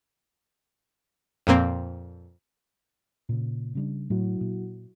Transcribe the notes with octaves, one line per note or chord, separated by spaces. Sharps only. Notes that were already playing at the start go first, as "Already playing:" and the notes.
F2 A#2 A#3 C4
A#2 C#3
C#3 G3 D4
A2 F#3 E4 F#4
A#2